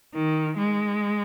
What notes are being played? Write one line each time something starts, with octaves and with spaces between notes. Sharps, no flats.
D#3
G#3